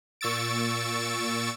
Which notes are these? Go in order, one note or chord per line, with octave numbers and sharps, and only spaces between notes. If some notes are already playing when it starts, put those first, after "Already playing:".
A#2 C#6 E6 A6 D7